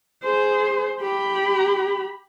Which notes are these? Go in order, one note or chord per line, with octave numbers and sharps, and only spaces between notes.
G#4 C5
G4 B5